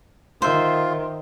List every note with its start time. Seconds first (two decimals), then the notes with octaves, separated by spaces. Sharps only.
0.42 D#3 F4 C5 E5